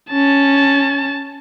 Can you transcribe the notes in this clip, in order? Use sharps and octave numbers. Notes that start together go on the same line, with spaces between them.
C#4 A5